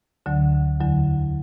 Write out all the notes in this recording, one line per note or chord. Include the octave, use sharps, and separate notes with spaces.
D2 D3 F#3
E2 D3 F#3